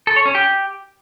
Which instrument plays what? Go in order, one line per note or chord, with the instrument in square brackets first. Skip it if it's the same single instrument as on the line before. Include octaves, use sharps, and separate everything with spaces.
[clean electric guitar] A4
C#5
C#4
G4